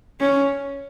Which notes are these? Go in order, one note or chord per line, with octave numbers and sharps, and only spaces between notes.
C#4